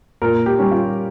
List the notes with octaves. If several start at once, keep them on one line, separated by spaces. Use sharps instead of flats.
A#2 A#4
G4
G3 C#4
F4